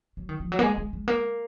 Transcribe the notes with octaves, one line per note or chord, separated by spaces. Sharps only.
F#3
D#3
F3
F#3
A#3
G#3
G#3
G#3
A#3